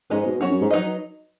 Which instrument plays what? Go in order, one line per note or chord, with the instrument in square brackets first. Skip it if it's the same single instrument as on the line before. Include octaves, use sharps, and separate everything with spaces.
[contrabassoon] G#2 [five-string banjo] G#3 C#4 B4 D#5
[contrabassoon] B2
[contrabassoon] F#2 [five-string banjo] C#4 F#4 C#5
[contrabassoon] F#2
G#2
[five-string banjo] F#3 D#4 B4 D#5